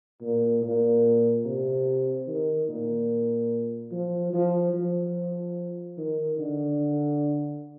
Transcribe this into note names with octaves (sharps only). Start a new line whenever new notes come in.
A#2
A#2
C3
D#3
A#2
F3
F3
F3
D#3
D3